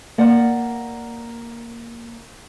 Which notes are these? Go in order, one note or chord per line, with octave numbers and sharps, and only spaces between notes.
A#3 D5 F#5